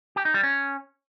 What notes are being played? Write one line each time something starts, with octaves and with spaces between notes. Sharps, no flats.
G4
D#4
G3
C#4